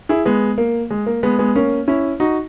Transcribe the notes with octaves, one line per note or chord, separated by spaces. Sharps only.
E4 G#4
G#3 B3
A#3
G#3
A#3
G#3 B3
G#3 B3
A#3 C#4
C#4 E4
D#4 F#4